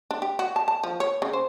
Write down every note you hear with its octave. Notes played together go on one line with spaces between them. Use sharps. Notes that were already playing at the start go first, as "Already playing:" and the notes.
D4
G4
F#4
A5
A5
F3
C#5
C#3
C5